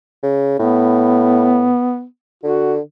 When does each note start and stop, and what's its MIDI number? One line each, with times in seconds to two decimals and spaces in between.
0.23 0.56 49
0.59 1.73 45
0.59 2.04 59
2.44 2.80 50
2.44 2.74 66